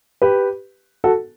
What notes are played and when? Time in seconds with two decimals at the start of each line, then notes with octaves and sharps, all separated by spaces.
0.22 G4 B4
1.04 F#4 A4